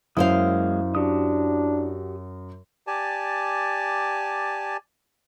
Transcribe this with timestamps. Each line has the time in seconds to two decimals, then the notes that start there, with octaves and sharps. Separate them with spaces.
0.17 F#2 G#3 A#3 E4 C5 F5 D#6
0.95 D4 F#4 G4 D#6
2.87 G4 D5 G#5 A5